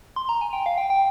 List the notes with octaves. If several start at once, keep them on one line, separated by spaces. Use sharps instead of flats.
C6
A#5
G#5
G5
F5
G5
G5